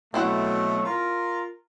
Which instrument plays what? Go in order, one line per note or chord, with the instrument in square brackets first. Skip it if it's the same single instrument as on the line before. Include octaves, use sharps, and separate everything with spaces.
[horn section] B2 F#3 A3 [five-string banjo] C4 E4 F#5
[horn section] F4 A#4